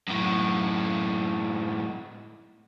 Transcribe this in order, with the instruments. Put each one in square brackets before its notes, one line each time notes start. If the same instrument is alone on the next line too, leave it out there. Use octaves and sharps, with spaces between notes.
[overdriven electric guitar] F#2 A2